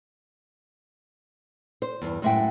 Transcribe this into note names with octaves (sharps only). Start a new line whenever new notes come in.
C5
E2 G2
F#2 A2 G#3 E5 F#5 G5